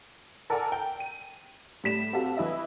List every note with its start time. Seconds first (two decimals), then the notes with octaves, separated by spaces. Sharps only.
0.50 A4 A#4 D5 F#5 G#5 A#5
0.72 G5
1.00 D#7
1.84 A2 G3 B6 E7
2.13 C4 F#4 G4 A4 F5
2.37 E3 E4 D#5 E5